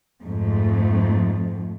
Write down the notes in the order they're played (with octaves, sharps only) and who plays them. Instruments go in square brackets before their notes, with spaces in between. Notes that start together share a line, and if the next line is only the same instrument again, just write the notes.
[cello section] F2 G#2 A3